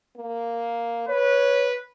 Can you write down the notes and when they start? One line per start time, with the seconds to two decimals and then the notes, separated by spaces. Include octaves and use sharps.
0.17 A#3
1.08 B4 C#5